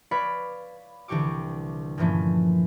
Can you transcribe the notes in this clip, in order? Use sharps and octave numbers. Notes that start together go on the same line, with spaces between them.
B4 C#5 D5 F5 B5
C2 D3 E3 G4 C#6 D6
G2 A#2 E3 F3 A3 C#4